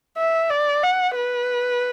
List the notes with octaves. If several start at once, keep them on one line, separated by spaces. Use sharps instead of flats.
E5
D5
F#5
B4